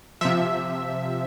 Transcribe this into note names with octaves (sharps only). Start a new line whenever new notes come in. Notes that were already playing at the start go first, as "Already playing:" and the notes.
C3 F3 E5